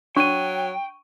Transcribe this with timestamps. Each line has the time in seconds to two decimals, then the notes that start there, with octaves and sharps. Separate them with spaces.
0.16 F#3 D4 G5 C#6 D#7